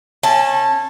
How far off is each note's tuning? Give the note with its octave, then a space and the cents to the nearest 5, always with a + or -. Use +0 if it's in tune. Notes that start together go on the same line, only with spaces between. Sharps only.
C#4 -25 A5 +0